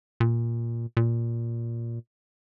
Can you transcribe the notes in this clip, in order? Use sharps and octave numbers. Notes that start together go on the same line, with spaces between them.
A#2
A#2